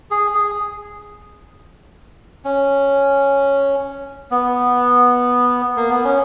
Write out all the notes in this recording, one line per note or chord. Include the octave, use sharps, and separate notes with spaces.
G#4
G#4
C#4
B3
A#3
B3
C#4